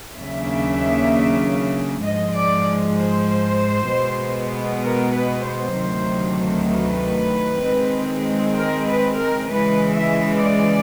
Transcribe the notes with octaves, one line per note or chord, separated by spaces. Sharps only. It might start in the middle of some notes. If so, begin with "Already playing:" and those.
D#2 C#3 F#3 A#3 D4 E5
G#2 F3 G#3 D#5
D5
C5
B2 G#3 B3
A#4
B4
C5
D2 C3 D#3 F#3 A3
B4
D#3 G#3 C4
A#4
B4
A#4
C#3 E3 G#3 B4
E5
D5